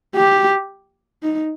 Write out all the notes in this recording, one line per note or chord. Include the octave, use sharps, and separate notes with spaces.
G4
D#4